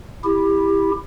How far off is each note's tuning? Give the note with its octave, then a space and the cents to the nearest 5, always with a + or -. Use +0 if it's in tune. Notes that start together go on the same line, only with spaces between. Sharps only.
E4 +0 G4 +20